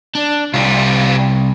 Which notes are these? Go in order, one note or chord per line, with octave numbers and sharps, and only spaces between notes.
D4
C2 G3 F4